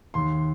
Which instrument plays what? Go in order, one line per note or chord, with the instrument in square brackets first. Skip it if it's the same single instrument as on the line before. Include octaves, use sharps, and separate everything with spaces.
[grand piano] D#2 C6